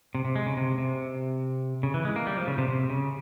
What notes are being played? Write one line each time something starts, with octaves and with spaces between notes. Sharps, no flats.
C3
C3
G#3
C#3
C3
C3
C#3
E3
G#3
A#3
G3
F3
C#3
C3
C3
C#3